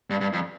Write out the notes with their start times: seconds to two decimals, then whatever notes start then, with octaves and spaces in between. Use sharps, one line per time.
0.10 G2
0.21 G2
0.33 F2